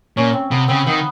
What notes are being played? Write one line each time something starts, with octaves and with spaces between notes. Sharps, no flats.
A#2 C#4
C4
C3 B3
C#3 C4
D#3 B3